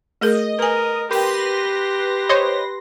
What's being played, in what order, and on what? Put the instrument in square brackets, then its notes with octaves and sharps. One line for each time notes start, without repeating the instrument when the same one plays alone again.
[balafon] A3 G#4 A#4 [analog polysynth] D#5
[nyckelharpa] A#4 [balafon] B4 G#5
[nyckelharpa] G4 [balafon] A#4 G5 [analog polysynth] B4 C6 A#6
[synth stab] C5 C#5 D#5